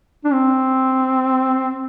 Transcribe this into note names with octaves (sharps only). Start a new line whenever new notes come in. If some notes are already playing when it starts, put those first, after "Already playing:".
D4
C4